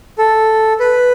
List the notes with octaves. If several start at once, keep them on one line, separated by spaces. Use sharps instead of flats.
A4
B4